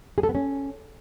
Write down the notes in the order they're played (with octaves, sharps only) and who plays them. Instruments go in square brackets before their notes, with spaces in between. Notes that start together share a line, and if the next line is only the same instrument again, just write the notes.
[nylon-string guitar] G#4
A4
B3
C#4